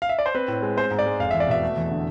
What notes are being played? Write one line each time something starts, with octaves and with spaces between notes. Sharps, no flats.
F5
E5
D5
C5
C4 B4
A2
G#3
C4 C5
G#2
D5
G#3
F1 F5
E2 E5
D5
B2 E5
A3
E2
D3